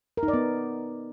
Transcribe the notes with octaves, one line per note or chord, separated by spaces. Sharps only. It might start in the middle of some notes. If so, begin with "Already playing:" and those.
A#4
D#4
D5
B3